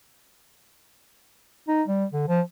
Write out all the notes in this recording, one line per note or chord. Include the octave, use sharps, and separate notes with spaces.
D#4
G3
D3
F3